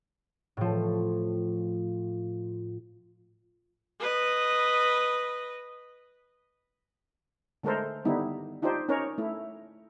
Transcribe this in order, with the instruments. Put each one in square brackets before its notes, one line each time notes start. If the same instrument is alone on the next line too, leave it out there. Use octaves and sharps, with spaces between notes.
[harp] A2 F3
[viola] B4 D#5
[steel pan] D3 G#3 A3 A4 A#4 C5
D3 D#3 G3 B3 D#4 E4
D4 D#4 F4 G4 C5
C#4 D#4 A#4 C#5
A3 E4